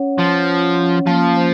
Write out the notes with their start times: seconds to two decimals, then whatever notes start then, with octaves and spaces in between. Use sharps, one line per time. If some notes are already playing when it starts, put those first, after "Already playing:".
Already playing: C#4 C#5 F#5
0.19 F3 F#5
0.48 C#4
0.78 C#4
1.07 F3 A#3
1.36 C5